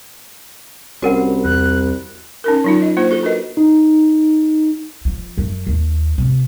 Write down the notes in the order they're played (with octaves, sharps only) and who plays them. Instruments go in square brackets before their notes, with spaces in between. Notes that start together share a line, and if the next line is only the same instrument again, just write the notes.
[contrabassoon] C2 [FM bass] C#4 [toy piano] F#4 A#4 F#5
[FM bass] E2 [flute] F#6
[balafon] C#4 D#4 A#4
F#3 D#4 F4
D#5
A#3 D4 F4 C5
F#4 A4
D4 A#4 B4 D#5
[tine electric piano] D#4
[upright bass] F3
F#2
D#2
C3